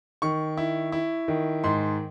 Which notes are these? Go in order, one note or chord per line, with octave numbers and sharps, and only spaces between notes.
D#3 C#6
E4
E4
D#3
G#2 C6